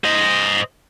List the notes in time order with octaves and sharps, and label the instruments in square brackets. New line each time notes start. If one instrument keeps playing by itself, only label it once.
[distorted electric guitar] C5 D#5